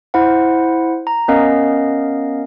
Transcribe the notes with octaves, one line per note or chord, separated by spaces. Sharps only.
E4 C5 F#5
A#5
B3 C#4 A#4 D#5 F5